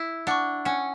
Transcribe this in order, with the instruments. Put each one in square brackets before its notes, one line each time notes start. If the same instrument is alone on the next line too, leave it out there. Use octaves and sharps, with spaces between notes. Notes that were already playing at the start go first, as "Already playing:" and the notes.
Already playing: [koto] E4
[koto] D4 [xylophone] F#5 C#6
[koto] C#4 [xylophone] F#5